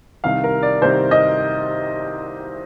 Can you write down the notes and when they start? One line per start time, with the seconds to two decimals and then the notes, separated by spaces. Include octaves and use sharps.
0.24 C2 C3 D#3 F5
0.44 A#4
0.63 D5
0.82 C2 C3 D#3 C5
1.11 D#5